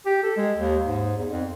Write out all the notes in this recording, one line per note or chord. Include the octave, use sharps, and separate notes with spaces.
G4
A4
G#3
D#2
G#2
E2
F2